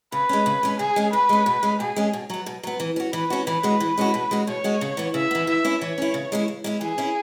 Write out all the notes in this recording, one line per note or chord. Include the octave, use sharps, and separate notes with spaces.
C#3 B4
G#3 C#4
C#3
G#3 C#4
C#3 G#4
G#3 C#4
C#3 B4
G#3 C#4
B2
G#3 C#4
B2 G#4
G#3 C#4
B2
F#3 B3
B2
F#3 B3
E3
C#4 F#4
E3 B4
C#4 F#4
E3 B4
G#3 C#4 F#4
E3
G#3 C#4 F#4
B2
G#3 C#4 F#4
B2 C#5
G#3 C#4 F#4
C#3
E3 B3
C#3 E5
E3 B3
E3 E5
C#4 E4
E3 C#5
C#4 E4
C#3
G#3 C#4 E4
C#3
G#3 C#4 E4
E3 G#4
C#4 E4